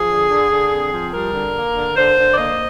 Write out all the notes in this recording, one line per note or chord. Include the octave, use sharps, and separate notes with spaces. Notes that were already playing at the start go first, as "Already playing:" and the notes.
Already playing: F3 G#4
D3
D3
D3
C4
F3
G3 A#4
D3
A#3
D3
D3 C5
D3
D5
A#3 D#5